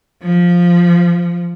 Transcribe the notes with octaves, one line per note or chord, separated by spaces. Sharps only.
F3